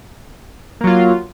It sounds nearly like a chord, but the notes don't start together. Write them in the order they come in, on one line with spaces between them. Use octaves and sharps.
A#3 F#3 F4